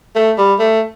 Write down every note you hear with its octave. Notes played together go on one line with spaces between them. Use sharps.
A3
G3
A3